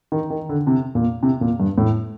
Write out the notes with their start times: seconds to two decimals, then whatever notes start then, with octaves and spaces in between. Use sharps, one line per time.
0.12 D#3
0.30 D#3
0.49 D3
0.67 C3
0.95 A#2
1.23 C3
1.41 A#2
1.60 G2
1.78 A2